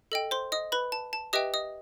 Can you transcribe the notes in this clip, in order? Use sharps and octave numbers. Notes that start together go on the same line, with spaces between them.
A4 D#5 G5
C5 C6
D#5 D#6
B4 B5
A5
A5
G4 B4 D#5 E5 G5 D#6
D#5 D#6